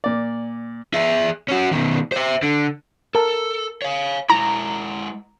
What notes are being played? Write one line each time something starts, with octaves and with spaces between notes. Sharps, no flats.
A#2 D5
G#4 E5
C#4 F#4
B2 D#3
C5 E5
D3
A4 A#4 A5
C#5 F5
G#3 E4 A#5